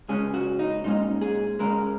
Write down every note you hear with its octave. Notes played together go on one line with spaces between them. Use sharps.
C#2 C#3 G#3 C#4 G#4
F#4
D#4
A#2 G#3 C#4 D#4
G#4
C#2 C#3 G#3 C#4 A#4